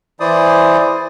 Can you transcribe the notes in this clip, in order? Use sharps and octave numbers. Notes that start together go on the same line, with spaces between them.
E3 E4 C5 D5 D#6